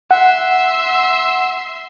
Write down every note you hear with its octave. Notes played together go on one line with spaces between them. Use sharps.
E5 F#5 C6